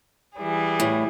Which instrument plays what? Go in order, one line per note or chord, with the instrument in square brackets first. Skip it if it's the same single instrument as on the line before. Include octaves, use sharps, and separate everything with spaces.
[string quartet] E3 G3 G#4
[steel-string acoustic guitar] A2